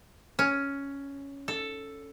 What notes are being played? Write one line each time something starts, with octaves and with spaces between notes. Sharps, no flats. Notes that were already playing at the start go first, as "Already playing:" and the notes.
C#4
A4